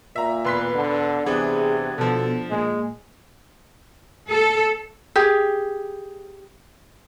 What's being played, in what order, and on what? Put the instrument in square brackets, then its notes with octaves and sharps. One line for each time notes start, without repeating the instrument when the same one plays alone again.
[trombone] A#2 [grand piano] E5 A#5
[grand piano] E1 C6 B6 [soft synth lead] B4
[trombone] D3
[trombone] C3 [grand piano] E3 B3 D4 [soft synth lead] G#4
[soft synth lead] B2 [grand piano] D3 F3 [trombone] A4
[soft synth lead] A#2 [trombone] G#3
[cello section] A4
[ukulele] G4 G#4